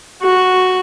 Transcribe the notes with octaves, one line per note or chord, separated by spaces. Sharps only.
F#4